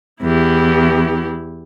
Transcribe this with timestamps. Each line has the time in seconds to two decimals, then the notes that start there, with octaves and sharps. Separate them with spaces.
0.22 E2 E4 G4